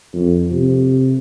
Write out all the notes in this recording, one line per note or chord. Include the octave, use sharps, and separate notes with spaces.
F2
C3